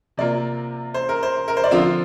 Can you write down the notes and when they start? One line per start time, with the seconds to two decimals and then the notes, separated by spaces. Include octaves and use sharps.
0.17 C3 A#3 F4 D5
0.94 C5
1.09 A#4
1.23 C5
1.48 A#4
1.57 C5
1.64 D5
1.71 D3 F3 C4 F4 F5